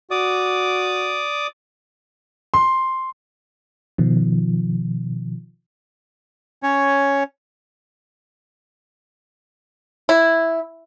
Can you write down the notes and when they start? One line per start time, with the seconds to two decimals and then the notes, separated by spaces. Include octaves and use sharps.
0.11 F#4 D5 D6 D#6
2.54 C6
3.98 B2 D#3 F3
6.63 C#4 C#5
10.09 E4